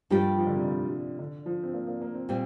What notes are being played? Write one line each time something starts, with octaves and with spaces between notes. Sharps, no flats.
G2 F3 G3 A#3 G4
F3
D3
C3
D3
D3
F3
C4
A#3
A#3
A#3
C4
A#2 G3 C4